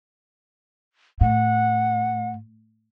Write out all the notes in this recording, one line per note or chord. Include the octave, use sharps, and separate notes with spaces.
A2 F#5